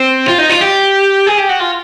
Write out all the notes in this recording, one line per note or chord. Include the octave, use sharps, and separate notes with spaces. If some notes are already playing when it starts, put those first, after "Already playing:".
Already playing: C4
F4
D#4
F4
G4
G#4
G4
F#4
F4